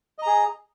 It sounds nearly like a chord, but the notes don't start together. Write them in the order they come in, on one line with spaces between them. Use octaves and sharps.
D#5 A#5 G#4